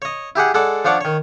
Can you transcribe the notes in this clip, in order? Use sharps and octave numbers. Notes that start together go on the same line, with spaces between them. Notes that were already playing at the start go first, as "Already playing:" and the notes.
C#5 D#5
E4 G4 G#4 F#5
G#3 A4 D5 F#5
F3 D4 C#5 F#5 D6
D#3 C#5